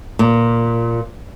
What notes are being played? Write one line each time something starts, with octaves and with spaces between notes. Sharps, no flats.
A#2